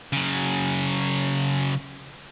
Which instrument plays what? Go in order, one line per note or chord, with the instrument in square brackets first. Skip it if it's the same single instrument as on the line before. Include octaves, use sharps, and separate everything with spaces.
[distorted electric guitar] C#3 F#3